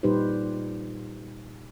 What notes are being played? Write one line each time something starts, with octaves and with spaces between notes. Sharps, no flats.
A#2 G3 D#4 G4 B4 C5